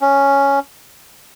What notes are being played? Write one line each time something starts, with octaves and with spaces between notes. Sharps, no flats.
C#4